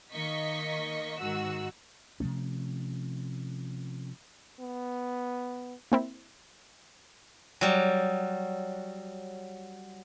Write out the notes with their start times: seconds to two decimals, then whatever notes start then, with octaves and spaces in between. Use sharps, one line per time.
0.11 D#3 A#3 D#5 C#6 B6
1.18 G#2 D#3 F#4 E6
2.20 C3 F3 A3 C#4
4.60 B3
5.92 A#3 C4 E4
7.61 F#3 G3